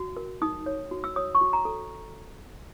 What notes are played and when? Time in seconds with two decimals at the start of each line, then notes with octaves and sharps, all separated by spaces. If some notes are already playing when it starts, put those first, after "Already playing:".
Already playing: F#4
0.17 A#4
0.42 D#4 D#6
0.66 C#5
0.91 F#4
1.04 E6
1.16 C#5 D#6
1.35 C#6
1.41 F#4
1.53 A#5
1.65 A4